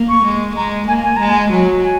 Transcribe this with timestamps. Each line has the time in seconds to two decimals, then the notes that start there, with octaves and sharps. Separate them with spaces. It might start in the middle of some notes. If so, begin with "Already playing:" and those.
Already playing: A#3
0.09 C#6
0.24 G#3
0.56 G#3 A#5
0.87 A#3 G#5
1.03 G#5
1.16 G#3 A#5
1.30 G#5
1.52 F#3
1.83 G#5